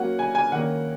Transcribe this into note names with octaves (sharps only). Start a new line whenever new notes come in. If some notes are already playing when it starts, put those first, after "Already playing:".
Already playing: F#3 A#3 C#4 F#5
G#5
G#5
D#3 A#3 C#4 F#5